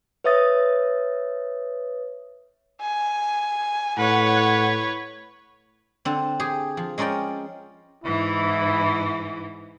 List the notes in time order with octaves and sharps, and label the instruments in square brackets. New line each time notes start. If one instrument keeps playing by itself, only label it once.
[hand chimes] B4 C#5 E5 D#6 A6
[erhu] G#5
[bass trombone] A2 [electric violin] B4 C#5 [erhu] F#5
[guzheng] D3 C4
G4 G#4
F3
G#3 C#4 A#4 D5 G5
[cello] G#2 E3 [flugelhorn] E4